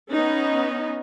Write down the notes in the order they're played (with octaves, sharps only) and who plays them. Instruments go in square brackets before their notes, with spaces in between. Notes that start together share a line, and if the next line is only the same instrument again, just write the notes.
[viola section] B3 C#4 D#4